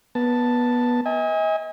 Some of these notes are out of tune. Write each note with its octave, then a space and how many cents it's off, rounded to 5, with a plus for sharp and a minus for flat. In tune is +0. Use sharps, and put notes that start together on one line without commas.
B3 -15 A5 +0
D#5 +40 G#5 -30